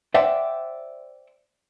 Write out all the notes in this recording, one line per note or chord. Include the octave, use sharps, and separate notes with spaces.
C5 D5 E5 F#5 G5